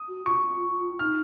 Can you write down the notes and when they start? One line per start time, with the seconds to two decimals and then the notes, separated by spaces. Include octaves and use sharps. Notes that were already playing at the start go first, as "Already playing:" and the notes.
Already playing: D#6
0.08 F#4
0.26 F4 C#6
0.99 D#4 F6